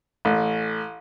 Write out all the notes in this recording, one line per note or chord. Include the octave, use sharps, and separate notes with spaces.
A1